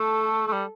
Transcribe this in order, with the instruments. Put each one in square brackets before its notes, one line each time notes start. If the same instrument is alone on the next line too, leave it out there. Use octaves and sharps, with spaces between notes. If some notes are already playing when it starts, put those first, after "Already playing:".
Already playing: [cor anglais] A3 [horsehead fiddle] A4
[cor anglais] A3
G3